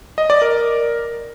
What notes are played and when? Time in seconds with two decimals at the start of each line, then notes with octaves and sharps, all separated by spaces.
0.18 D#5
0.30 D5
0.42 A#4